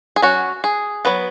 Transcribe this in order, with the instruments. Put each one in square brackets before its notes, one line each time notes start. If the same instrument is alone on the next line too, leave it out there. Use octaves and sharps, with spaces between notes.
[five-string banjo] G#4
F#3 C#4 F#4
G#4
F#3 B3 B4